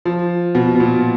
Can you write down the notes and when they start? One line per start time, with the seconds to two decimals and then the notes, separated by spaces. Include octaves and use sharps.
0.05 F3
0.55 B2
0.75 B2
0.80 A#2